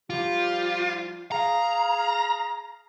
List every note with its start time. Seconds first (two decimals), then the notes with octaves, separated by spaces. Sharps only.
0.10 F3 G3 F4 G4
1.32 G#4 F5 A#5